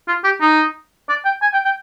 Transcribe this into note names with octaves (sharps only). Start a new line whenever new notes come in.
F4
G4
D#4
D5
G5
G#5
G5
G5